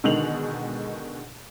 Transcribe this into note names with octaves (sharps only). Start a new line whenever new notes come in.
B2 D3 D#3 G#3 F7 F#7